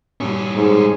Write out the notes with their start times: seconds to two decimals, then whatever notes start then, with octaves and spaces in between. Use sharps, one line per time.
0.21 G2 C#4
0.54 G#2